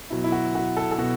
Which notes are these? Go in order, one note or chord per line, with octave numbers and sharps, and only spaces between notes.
B2 F#3 E4
E4
F#4
F#4
A4
A4
B2 F#4